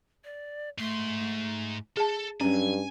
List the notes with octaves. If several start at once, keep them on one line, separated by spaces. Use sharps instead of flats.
D5
G#2 A3 C6
G#4 A4 A5
G2 F#3 C#4 G#5